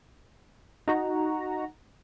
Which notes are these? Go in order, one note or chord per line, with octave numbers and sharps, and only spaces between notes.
D#4 F#4 A#5